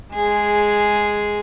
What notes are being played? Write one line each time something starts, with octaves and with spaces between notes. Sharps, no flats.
G#3 G#4